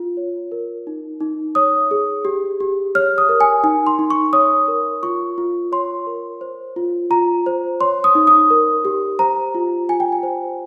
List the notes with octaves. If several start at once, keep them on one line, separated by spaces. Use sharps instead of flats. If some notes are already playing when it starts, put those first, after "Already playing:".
Already playing: F4
C#5
A#4
D#4
D#4
C#5 D#6
G#4
G4
G4
C#5 F6
D#6
A#4
G#5
D#4 G#5
C6
D#4
C#6
C#5 D#6
A#4
F4 C#6
F4
C#5 C6
A#4
C5
F4
F4 A#5
C5
C#5 C6
D#6
D#4
D#6
A#4
G4
C5 A#5
F4
F4 G#5
G5
G#5
C5